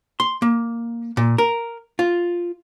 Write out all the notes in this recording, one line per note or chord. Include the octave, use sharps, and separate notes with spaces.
C6
A#3
A#2
A#4
F4